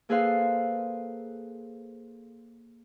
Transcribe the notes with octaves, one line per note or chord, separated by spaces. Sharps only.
A#3 G#4 A4 B4 C5 F5